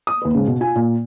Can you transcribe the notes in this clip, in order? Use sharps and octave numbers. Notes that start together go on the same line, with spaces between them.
D#6
D#2 B4
G#2 C#3
B2
F4 G#5
A#2